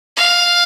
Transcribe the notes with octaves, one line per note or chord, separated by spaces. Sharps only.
F5